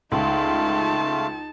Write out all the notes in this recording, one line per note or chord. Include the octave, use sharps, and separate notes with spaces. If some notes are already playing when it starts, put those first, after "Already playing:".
C#2 A3 D#4 F4 F5 A5